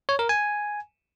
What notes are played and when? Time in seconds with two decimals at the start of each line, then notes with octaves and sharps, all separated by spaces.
0.09 C#5
0.19 A#4
0.29 G#5